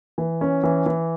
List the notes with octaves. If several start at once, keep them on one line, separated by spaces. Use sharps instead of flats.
E3
C#4
E3
E3